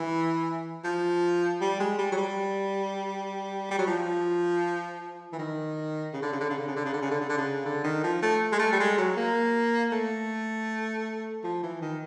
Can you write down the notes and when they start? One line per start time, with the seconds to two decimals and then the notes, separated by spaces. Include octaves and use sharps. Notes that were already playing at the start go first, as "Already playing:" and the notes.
Already playing: E3
0.84 F3
1.61 G3
1.80 G#3
1.98 G3
2.12 F#3
2.17 G3
3.71 G3
3.79 F#3
3.87 F3
5.33 E3
5.39 D#3
6.14 C#3
6.22 D3
6.33 C#3
6.40 D3
6.50 C#3
6.58 D3
6.68 C#3
6.76 D3
6.85 C#3
6.93 D3
7.02 C#3
7.11 D3
7.21 C#3
7.29 D3
7.38 C#3
7.65 D3
7.84 D#3
8.04 F3
8.22 A3
8.52 G#3
8.59 A3
8.73 G3
8.79 G#3
8.98 F#3
9.17 A#3
9.92 A3
11.44 F3
11.63 E3
11.82 D#3